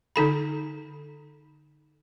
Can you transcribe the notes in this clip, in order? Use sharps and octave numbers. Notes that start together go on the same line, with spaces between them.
D3 D#4 A4 B5